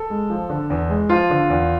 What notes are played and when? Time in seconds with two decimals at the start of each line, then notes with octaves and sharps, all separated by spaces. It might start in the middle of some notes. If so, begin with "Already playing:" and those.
Already playing: A4
0.10 G#3
0.30 F3
0.49 D3
0.70 E2
0.90 G#3
1.09 F3 F4
1.30 D3
1.50 E2